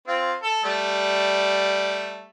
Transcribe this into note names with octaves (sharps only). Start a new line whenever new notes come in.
C4 F4
A4
G3 A3